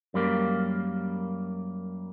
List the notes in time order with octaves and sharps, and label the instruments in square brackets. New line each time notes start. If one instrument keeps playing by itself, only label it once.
[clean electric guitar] F#2 G3 A#3